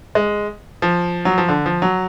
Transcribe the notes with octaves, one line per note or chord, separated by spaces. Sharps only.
G#3
F3
F#3
F3
D3
F3
F#3